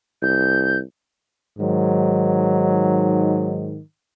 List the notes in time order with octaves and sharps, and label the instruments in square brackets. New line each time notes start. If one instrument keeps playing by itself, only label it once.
[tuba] C2 [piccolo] G6
[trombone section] G#2 D#3 F#3